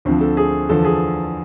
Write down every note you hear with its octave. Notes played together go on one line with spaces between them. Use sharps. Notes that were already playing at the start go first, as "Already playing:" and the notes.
D2 D3 F3 C4
A4
G#4
E2 D3 F3 A4
G#4